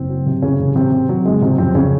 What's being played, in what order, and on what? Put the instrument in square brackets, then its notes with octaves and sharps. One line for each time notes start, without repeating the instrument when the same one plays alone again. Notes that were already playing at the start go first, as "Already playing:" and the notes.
Already playing: [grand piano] F#1 C4
F#3
C3
F#1 C#3 C#4
C3
C3 C4
C3
C3 F#3
F#1 G#3
C3 F#3 C4
F2 C3 C4
C#3 C#4